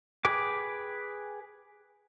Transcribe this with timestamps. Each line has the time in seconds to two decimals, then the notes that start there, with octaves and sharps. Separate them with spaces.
0.25 G#4 B4 G5 D6